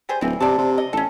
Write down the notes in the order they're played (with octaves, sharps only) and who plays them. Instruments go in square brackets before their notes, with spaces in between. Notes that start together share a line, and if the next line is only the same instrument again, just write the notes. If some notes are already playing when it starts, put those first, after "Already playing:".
[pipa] G3 G#4 C5
[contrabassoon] D1 [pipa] E3 C4
[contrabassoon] C3 [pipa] D5 A5
[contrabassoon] C3
[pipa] D#5
[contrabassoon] A1 [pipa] C#4 A4